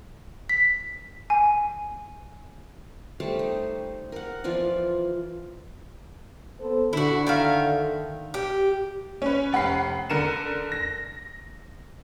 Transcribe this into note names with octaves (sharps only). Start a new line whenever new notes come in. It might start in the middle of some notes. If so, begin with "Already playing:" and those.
B6
G#5
G3 A3 C5 A5
D#4
A#4 F#5
E3 F3 F4 D5
B3 A4 C5
D3 E4 F#4
D#3 E5 F5
G4
C#4 B4
F1 F#5 B5 C7
D3 A#4 C#7 D#7 E7
A#6